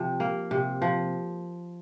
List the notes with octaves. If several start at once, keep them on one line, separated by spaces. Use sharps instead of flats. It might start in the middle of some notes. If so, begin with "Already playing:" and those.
Already playing: C3 F3
A#3
C3
F3